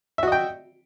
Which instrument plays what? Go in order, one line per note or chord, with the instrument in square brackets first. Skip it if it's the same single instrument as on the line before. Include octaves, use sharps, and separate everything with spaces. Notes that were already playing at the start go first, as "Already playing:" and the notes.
[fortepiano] E5
F#4
D#5
G5